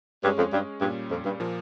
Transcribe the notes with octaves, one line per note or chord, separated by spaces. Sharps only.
G2 G#3 C#4 G#4 C#5
F2
G2
G2 A#2 G3 C#4
F2
G2
A#2 F3 A#3